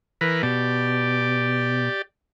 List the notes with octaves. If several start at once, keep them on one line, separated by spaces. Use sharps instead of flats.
E3 A#4 B4
B2 G4 D5